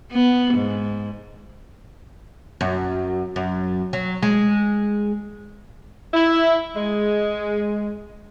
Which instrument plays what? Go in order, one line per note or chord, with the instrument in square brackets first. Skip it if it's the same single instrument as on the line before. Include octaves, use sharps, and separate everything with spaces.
[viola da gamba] B3
G#2
[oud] F#2
F#2
F#3
G#3
[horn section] E4
G#3